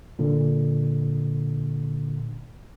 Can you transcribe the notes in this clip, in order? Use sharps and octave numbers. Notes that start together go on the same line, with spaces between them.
A#2 D3